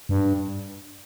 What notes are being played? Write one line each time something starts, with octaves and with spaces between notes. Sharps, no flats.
G2